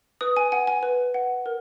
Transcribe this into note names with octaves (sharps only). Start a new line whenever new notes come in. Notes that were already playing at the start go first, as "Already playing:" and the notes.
B4 D#6
G#5
F#5 G#5
G#5
B4
F#5
A#4